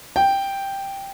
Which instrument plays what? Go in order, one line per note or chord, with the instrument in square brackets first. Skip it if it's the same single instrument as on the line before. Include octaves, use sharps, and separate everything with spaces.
[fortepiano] G5